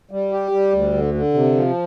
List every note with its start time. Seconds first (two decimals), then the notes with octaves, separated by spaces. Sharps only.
0.11 G3
0.32 G4
0.52 G3
0.73 D2
0.93 D3
1.14 D3
1.34 C3
1.55 F3